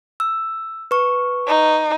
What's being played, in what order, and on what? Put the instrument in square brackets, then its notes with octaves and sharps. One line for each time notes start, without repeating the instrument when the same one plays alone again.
[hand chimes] E6
B4 C#6
[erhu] D#4